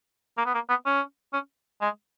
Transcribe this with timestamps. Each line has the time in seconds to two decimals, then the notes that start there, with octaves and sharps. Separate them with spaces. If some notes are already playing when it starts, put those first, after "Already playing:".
0.37 A#3
0.46 B3
0.54 A#3
0.69 B3
0.86 C#4
1.33 C#4
1.81 G#3